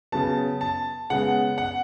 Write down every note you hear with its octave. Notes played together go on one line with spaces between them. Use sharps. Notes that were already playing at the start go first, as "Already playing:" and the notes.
C#3 F#3 B3 A5
A5
C#3 G#3 B3 F#5
F#5